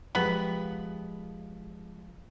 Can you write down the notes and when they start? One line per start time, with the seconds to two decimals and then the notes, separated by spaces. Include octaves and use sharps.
0.15 F3 G#3 B3 G4 B5